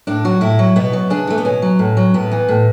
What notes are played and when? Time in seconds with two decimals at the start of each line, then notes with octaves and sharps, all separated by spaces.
0.07 A2 D4
0.25 F#3 F#4
0.41 A2 E4
0.59 F#3
0.76 B2 B3
0.93 F#3
1.10 C#3 D4
1.27 E3 A3
1.38 B3
1.45 B2 C#4
1.62 F#3
1.79 A2
1.97 F#3
2.14 A2 B3
2.32 E3
2.48 A2